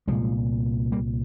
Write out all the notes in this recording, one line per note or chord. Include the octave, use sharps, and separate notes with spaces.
C2 A#2 F3 G#3
G3 A#3